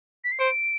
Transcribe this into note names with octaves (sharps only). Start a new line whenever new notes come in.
B6
C7
C5 D7